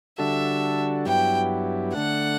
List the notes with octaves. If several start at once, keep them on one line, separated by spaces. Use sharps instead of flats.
D3 G3 D4 F#4 A4 E5
G2 F#3 B3 E4 G4 G5
D3 A3 D4 F#5